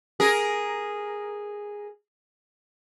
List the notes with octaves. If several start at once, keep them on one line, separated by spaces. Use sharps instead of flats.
G#4 A#4